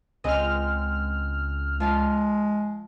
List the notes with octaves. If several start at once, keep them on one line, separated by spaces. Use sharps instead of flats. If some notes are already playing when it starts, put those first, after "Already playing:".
C#2 G#3 C4 D#5 F6
F3 G#3 F4 F5